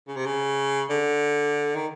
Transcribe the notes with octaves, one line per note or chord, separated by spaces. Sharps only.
C#3
C3
C#3
D3
D#3